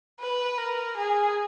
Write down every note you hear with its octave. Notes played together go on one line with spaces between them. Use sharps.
B4
A#4
G#4